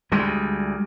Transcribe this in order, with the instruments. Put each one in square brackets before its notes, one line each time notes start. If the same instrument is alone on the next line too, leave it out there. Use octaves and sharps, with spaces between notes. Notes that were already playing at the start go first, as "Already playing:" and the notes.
[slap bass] D2 G3 G#3